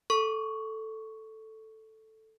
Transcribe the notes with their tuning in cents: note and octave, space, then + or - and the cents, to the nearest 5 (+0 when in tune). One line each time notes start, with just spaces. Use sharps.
A4 +0 C#6 +0